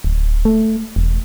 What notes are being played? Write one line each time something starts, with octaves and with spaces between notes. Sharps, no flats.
D1
A3
E1